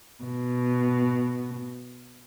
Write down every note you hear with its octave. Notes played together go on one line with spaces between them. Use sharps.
B2